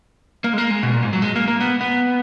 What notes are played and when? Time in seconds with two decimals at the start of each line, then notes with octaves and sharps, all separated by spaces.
0.44 A#3
0.53 G#3
0.58 A#3
0.70 G#3
0.83 B2
0.93 A#2
1.03 G#2
1.13 F#3
1.22 G#3
1.36 A#3
1.48 A#3
1.61 B3
1.81 B3